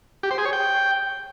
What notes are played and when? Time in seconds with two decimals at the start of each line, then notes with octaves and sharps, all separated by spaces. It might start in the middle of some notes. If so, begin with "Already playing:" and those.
0.23 G4
0.31 C5
0.38 G#4
0.45 C#5
0.53 G5